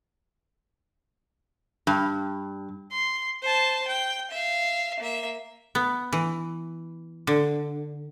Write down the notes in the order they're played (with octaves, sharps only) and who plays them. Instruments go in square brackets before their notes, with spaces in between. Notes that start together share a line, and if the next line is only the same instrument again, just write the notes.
[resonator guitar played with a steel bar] G2
[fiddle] C6
C5 A5
G5
E5 F5
A#3 E5
[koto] B3
E3
D3